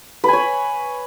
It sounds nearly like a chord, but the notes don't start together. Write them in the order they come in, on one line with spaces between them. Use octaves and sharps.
B4 G#5 C#5